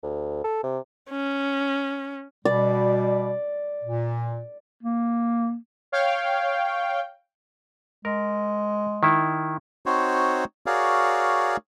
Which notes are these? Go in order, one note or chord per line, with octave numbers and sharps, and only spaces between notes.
D2
A4
C3
C#4
B2 G3 D5
A#2
A#3
C#5 F5 G5
G#3 A#4
D#3 E4
C4 D#4 F#4 C5 C#5
F#4 G#4 A#4 C#5 D5 F5